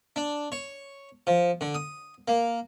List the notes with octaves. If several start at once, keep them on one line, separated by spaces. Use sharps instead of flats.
D4
C#5
F3
D3
D#6
A#3